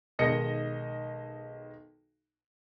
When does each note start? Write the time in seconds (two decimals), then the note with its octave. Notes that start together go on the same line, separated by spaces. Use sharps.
0.19 B1 D#3 G#3 D#5 A#6 C#7